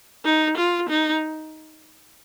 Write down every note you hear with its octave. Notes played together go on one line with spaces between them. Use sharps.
D#4
F4
D#4